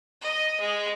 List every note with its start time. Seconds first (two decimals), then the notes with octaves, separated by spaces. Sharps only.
0.21 D#5
0.60 G#3